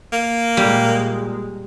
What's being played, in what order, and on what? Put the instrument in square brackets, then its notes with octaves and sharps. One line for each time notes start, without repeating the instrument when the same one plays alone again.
[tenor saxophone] A#3
[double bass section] A#2 G#3 [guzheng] G3